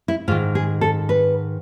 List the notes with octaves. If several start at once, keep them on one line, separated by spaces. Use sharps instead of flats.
E4
G#2 D#3 F4
G#4
A4
B4